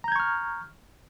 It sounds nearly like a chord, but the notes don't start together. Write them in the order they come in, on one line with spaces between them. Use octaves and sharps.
A#5 G6 G#6 C#6 F6